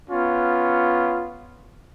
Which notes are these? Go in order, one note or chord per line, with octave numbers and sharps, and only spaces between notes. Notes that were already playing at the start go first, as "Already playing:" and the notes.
B3 C#4 F4